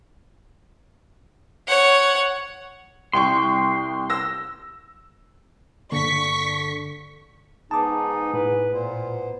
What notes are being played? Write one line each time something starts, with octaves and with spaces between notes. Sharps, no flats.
C#5 F#5
C2 G5 C6 C#6
E6 A#6
G2 D3 A#3 C#6 B6
G#2 B3 D#4 G#4 A5 D6
A2 B4
A#2 B3 C5